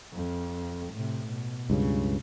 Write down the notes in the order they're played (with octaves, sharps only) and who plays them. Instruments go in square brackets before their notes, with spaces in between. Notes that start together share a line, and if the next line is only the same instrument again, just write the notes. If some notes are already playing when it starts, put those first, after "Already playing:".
[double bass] F2
A2 C3
B2
[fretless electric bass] C#2 G2 C#3